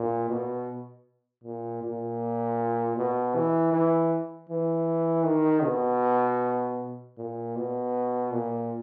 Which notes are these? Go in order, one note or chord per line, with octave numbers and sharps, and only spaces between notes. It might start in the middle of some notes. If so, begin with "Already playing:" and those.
Already playing: A#2
B2
A#2
A#2
B2
E3
E3
E3
D#3
B2
A#2
B2
A#2